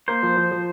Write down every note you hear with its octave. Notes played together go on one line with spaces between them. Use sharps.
A#3 C5
F3
F3
F3